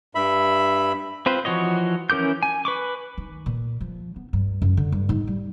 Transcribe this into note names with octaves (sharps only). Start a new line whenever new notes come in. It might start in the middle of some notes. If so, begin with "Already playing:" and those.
G2 E5 B5
C4 F4 B4 C5
E3 F3 F#4 C#5 D#5
E3 C#4 A#4 D6 G6
G#5
B4 C#6 D6
D#3
A#2
F3
B3
G2
F#2
D3
G2
G#2
G3